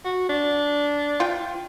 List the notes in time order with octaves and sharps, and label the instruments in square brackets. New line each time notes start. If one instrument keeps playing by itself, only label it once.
[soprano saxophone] F#4
D4
[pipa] F4 G5